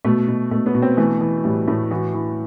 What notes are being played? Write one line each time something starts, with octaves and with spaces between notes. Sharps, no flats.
B2 A3
B2
B2 A3
B3
B2
C4
E3 A3
E3
A2 G3
A2 A3
E3 F#4
E3